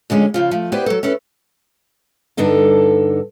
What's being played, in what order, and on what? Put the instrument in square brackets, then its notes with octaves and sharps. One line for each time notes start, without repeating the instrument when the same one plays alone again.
[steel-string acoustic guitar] F2 D3 G#3 C#4
C#3 F3 F4
F3 A3
B3 E4 G4 B4 C5 D5
F#3 A4
C#4 E4 A4 B4
G2 D3 D#4 A4 D5